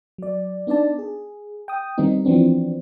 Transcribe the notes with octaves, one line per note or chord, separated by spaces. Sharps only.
F#3 D5
B3 D4 D#4 D5 A5
G#4
G5 D#6
D#3 G3 B3 C4 D#4
E3 F3 B3 C4 D4